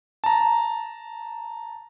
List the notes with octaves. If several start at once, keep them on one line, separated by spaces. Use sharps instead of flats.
A5 A#5